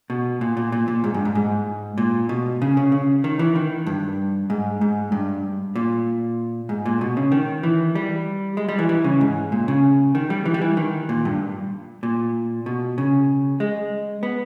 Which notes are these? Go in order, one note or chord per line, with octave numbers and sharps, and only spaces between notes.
B2
A#2
A#2
A#2
A#2
G#2
G2
G#2
G#2
A#2
B2
C#3
C#3
C#3
D#3
E3
D#3
G2
G#2
G#2
G2
A#2
G#2
A#2
B2
C#3
D#3
E3
G3
G#3
G3
E3
E3
C#3
G#2
A#2
C#3
D#3
G3
E3
G3
E3
D#3
A#2
G2
A#2
B2
C#3
G#3
B3